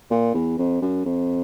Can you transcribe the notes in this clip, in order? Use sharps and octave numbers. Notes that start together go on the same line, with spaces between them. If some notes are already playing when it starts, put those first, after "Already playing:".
A#2
E2
F2
F#2
F2